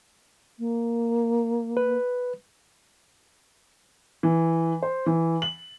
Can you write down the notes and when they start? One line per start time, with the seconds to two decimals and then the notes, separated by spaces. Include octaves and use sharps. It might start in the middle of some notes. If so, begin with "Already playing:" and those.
0.59 A#3
1.77 B4
4.23 E3
4.83 C5
5.06 E3
5.42 F#7